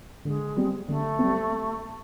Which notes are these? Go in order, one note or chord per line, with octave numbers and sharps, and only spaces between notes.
D3 G#3
G3 C4
D3 A3
G3 C4